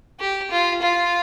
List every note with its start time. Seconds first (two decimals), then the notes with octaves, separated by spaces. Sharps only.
0.20 G4
0.51 F4
0.82 F4